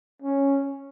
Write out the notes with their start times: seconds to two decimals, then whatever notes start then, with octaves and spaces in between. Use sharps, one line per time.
0.22 C#4